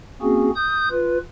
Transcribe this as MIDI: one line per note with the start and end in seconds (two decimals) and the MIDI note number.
0.22 0.50 58
0.22 0.50 60
0.22 0.50 61
0.22 0.50 66
0.22 0.50 68
0.56 0.89 87
0.56 0.89 91
0.90 1.18 65
0.90 1.18 71